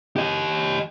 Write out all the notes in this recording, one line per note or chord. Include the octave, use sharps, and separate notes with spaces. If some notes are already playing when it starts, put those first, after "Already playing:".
G4 D#5